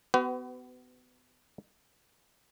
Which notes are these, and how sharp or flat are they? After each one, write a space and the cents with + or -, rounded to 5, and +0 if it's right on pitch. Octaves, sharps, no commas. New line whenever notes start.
B3 +25 F#4 +40 B4 +45